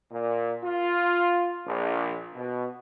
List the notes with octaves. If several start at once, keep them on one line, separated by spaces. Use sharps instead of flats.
A#2
F4
A#1
B2